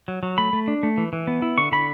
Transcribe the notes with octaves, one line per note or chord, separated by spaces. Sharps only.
F#3
F#3
A3 B5
A3
D4
A3
E3
E3
B3
E4
D3 C#6
D3 B5